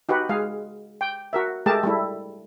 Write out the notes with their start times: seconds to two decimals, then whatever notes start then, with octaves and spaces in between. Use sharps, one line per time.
0.09 D#4 F#4 G4 B4
0.29 G#3 G#4 F5
1.01 G5
1.33 F#4 A#4 E5
1.66 G#3 A3 G4 G#4 A#4 A5
1.83 G3 A3 E4